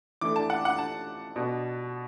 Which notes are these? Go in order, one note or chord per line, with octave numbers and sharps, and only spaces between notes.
E3 A3 D4 D6
A5
F#5
F#5
A5
B2 B3 D4